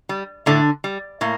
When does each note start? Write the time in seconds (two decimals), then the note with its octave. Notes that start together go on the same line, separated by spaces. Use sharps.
0.09 G3
0.46 A2 D3 D4
0.84 G3
1.21 A2 A#3